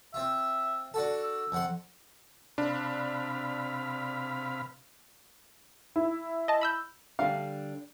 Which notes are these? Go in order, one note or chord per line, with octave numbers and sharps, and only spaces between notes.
C4 F4 E5
D4 F#4 A4
E6
F2 F#5 C6
C3 D4 F5 B5
E4
D#5 A5
B5 E6 G6
D3 G3 D4 F5